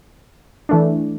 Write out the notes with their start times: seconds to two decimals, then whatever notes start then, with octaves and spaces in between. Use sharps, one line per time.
0.69 E3 A3 D4